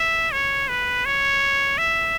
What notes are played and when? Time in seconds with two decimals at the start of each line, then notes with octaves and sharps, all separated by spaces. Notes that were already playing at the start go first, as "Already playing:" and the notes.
Already playing: E5
0.32 C#5
0.68 B4
1.05 C#5
1.78 E5